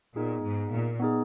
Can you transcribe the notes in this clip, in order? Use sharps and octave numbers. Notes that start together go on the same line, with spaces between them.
A#2 B3 D#4 G#4
G#2
A#2
B3 D#4 G#4